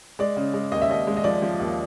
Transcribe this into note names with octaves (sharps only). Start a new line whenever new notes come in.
G#3 D5
C#3
G#3
D#2 D#5
E5
D#2 D#5
G#3
D#5
F3 D5
F3
D#2